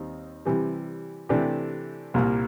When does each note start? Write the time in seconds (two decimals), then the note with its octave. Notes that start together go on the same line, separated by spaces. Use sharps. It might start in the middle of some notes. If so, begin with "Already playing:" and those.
Already playing: D#2 G3 C4 D#4
0.46 C3 E3 G3
1.29 C3 E3 A3 D4 G4
2.14 C2 A#2 G3 A#3